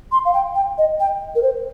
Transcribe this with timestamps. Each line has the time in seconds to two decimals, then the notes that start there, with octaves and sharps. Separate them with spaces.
0.12 C6
0.25 F5
0.34 G5
0.55 G5
0.78 D#5
1.00 G5
1.35 A#4
1.43 C5